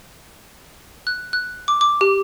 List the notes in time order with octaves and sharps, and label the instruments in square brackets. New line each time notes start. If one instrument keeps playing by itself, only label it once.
[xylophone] F#6
F#6
D6
D6
G4